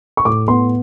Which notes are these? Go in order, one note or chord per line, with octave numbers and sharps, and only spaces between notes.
C#6
A2 D6
B3 C6